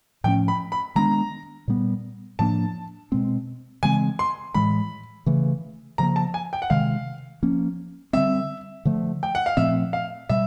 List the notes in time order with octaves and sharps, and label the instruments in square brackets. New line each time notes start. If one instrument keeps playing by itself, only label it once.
[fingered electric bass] A2 F3 A3 C#4 [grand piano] G5
[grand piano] B5
B5
[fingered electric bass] D#3 G#3 B3 D4 [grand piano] A#5
[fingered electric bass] A#2 G3 B3
[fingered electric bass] A2 F3 A#3 D4 [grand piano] A5
[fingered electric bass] B2 G#3 C4
[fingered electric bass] C#3 E3 G#3 C4 [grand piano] G#5
[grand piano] C6
[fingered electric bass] A2 E3 G#3 [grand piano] B5
[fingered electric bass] C#3 E3 A3
[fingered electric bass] C#3 F3 A#3 [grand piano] A#5
[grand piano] A5
G#5
G5
F#5
[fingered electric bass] C3 D#3 G#3 [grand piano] F5
[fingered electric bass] F3 A#3 C#4
[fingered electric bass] D3 G3 C4 [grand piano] E5
[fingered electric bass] D3 F3 A3
[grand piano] G5
F#5
F5
[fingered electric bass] A#2 F3 A3 C4 [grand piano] E5
[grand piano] F5
[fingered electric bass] B2 G3 [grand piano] E5